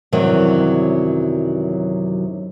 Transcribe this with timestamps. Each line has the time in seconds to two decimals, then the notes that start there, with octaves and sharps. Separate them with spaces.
0.12 F#2 C3 D#3 E3 F#3 G3